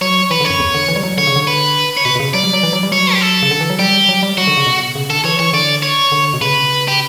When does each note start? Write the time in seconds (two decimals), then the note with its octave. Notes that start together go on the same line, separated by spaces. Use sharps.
0.01 F#3 C#5
0.31 E3 B4
0.40 D3
0.45 C#5
0.50 F#2
0.60 E2
0.74 D3
0.88 E3
0.96 G3
1.03 F#3
1.18 D3 C#5
1.27 C#3
1.36 D3
1.47 B4
1.97 C#5
2.05 B2 B4
2.15 B2
2.20 C#3
2.33 F#3 D5
2.43 G3
2.53 F#3
2.63 E3
2.73 F#3
2.83 G3
2.92 F#3 C#5
3.14 G4
3.21 A4
3.42 C#3
3.51 D3
3.61 E3
3.70 F#3
3.79 G3 G4
4.09 F#3
4.23 G3
4.37 F#3 F#4
4.47 D3
4.57 C#3
4.66 B2
4.95 C#3
5.10 D3 A4
5.25 E3 C#5
5.39 E3 C#5
5.53 D3 D5
5.83 C#5
6.12 D3
6.34 B2
6.41 C#3 B4
6.88 G4